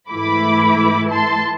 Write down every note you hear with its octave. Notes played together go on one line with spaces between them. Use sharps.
G#2 E3 A3 E4 B5 D6
A5 C6